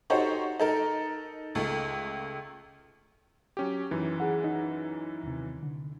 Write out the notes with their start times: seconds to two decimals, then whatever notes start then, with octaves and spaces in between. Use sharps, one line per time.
0.10 D#4 F#4 G4 A4 C5 C#5
0.60 D#4 A4 A#4
1.55 C#2 A3
3.57 F#3 C#4 G4
3.91 F#2 E3 D#4
4.20 G#4 F#5
4.44 D#4
5.23 D#2 C3
5.63 D3